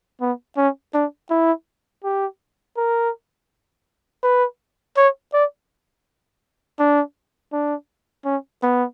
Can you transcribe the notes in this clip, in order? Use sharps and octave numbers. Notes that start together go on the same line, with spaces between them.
B3
C#4
D4
E4
G4
A#4
B4
C#5
D5
D4
D4
C#4
B3